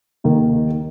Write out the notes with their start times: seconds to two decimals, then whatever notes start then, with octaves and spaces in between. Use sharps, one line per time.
0.24 D#2 D#3 A#3